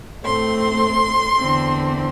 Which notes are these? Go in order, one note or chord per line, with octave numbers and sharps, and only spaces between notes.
A2 A3 C4 C6
E2 D3 C4